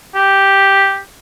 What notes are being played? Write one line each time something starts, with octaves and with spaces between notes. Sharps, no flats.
G4